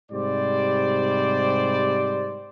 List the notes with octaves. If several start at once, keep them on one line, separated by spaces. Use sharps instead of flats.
G#2 C3 G3 C5 D5